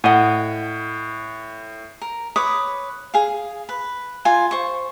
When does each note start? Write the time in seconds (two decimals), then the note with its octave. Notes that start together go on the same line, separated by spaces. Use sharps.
0.04 A2 D#5 F#5 G#5
2.02 A#4
2.36 B4 C#5 D6 D#6
3.14 G#4 F5
3.69 B4
4.25 F4 G#5
4.51 C5 C#6